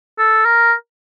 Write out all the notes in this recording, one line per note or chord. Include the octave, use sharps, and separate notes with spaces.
A4
A#4